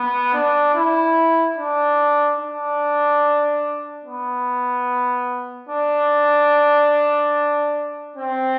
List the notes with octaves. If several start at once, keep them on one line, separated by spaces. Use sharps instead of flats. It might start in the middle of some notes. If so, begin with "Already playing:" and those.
Already playing: B3
D4
E4
D4
D4
B3
D4
C4